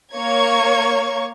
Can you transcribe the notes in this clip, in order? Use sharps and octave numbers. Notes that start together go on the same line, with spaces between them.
A#3 C#5 C#6 G#6